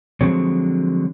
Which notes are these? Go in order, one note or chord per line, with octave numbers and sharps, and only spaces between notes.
D3 F3 F#3 G#3 C4 C#5